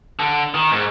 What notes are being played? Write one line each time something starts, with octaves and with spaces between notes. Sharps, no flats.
D3
D#3
G#2